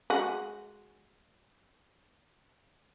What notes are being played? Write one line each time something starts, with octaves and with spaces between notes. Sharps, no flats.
G#3 F#4